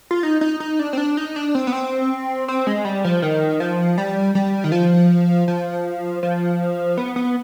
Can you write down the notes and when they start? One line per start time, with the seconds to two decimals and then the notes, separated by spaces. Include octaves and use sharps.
0.11 F4
0.23 D#4
0.41 D#4
0.60 D#4
0.79 D4
0.93 C4
0.98 D4
1.17 D#4
1.36 D4
1.55 C4
1.67 B3
1.73 C4
2.48 C4
2.67 G#3
2.85 G3
3.05 F3
3.22 D#3
3.60 F3
3.98 G3
4.35 G3
4.64 D#3
4.72 F3
5.48 F3
6.23 F3
6.98 B3
7.16 B3